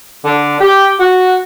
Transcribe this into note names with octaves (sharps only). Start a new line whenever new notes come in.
D3
G4
F#4